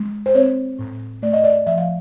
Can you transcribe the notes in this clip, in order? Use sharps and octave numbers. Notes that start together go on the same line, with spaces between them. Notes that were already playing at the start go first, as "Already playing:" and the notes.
Already playing: G#3
C5
C4 C#5
A2
A3 D5
D#5
D5
F3 E5
F5